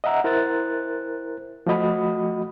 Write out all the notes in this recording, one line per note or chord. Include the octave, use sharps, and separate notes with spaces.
D#5 E5 F#5 A#5 E6
E4 A#4 C5 F#6 A6
F3 A3 F#4 D#5 B5 D#6